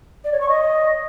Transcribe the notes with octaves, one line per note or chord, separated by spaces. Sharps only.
D5
C#5
C#6
D#5